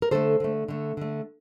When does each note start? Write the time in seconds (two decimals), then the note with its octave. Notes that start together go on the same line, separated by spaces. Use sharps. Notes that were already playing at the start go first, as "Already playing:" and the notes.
0.02 A#4
0.11 D3 A3 A4 C5
0.40 D3 A3
0.68 D3 A3
0.97 D3 A3